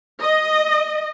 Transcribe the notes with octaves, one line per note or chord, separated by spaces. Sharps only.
D#5